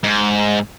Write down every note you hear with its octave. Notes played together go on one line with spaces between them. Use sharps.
G#2